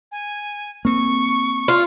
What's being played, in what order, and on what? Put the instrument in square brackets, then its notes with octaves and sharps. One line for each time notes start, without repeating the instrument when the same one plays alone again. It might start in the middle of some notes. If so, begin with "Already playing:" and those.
[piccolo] G#5
[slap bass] A#3 C4 [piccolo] C#6
[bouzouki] F4